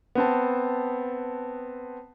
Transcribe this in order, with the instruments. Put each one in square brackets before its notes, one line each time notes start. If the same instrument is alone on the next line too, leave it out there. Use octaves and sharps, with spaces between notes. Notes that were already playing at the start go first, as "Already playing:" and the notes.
[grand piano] B3 C4 A5